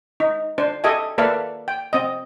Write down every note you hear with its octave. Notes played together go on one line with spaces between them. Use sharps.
D#4
D4 C5
G4 A4 D#5 E5 G#5
A#3 A4 B4 D5 E5 F5
G5
C4 D#5